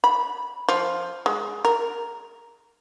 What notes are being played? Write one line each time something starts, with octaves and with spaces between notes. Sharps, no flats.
B5
F3
G#3
A#4